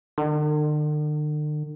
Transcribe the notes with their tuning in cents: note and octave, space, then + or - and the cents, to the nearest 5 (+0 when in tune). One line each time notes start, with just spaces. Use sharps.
D3 +45